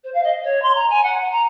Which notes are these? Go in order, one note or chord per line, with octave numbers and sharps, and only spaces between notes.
C5
F5
D#5
C#5
C6
A#5
G#5
F#5
A#5